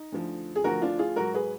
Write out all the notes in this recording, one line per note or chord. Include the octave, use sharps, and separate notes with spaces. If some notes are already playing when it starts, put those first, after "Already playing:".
Already playing: D#4
D2 D3 F3
G#4
D2 D3 F3 F#4 A#4
D4 F4
F4 G#4
G#2 F#3 F#4 A#4
G#4 B4